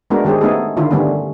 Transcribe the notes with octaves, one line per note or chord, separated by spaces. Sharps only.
G#3 A3 B3 D4 F#4 A#4
D#3 G#3 G4 G#4 C5
A3 B3 C#4 D#4 G#4 A4
D3 D#3 E4 F4
D3 D#3 G3 A3 B3 C#4